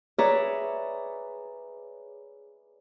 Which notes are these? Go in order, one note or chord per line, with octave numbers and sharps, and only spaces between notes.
G#4 B4 C#5 D5 E5 A#5